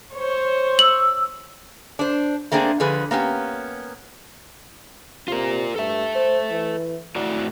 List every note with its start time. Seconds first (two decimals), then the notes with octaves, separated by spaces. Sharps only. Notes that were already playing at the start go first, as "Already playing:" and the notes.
0.13 C5 C#5
0.79 E6 F#7
1.99 D4 C5
2.52 A3 A#3 C4 D4 G#4
2.80 D3 F3 G#4 B4
3.11 A#3 B3 C#4 G4
5.28 C3 F4 A#4
5.76 G2 A4 E5
6.15 C5
6.51 E3
7.16 A2 E4 F#4 D5